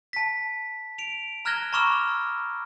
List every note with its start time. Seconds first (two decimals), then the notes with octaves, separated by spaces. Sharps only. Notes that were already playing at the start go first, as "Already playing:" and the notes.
0.13 A5 B6
0.98 D7 F7
1.45 A#5 F6 F#6 G#6 A#6 G7
1.73 A#5 B5 C#6 D6 E6 F6